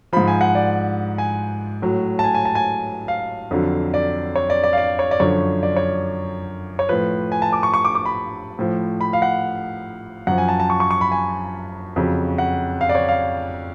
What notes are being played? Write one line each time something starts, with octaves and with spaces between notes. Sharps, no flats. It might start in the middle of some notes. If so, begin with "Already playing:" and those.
G#2 F3 B5
G#5
F#5
D5
G#5
A2 F#3
A5
G#5
G#5
A5
G#5
F5
F2 D3 F#3
D5
C#5
D5
D5
F5
D5
C#5
D5
F#2 D3 F3 C#5
D5
C#5
C#5
A2 F3 B4
G#5
A5
D6
C#6
C#6
D6
D6
B5
A2 F3
B5
F5
F#5
F#2 F3 F#5
G#5
A5
A5
C#6
C#6
C#6
B5
G#5
F2 C#3 F#3
F#5
F5
D5
C#5
F5